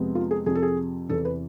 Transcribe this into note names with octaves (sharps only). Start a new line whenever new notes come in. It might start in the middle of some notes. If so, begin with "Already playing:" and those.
Already playing: F2 C3 G#3 B3
F4
G#4
F2 C3 F3 G#4
A4
G#4
E2 C3 E3 A4
B4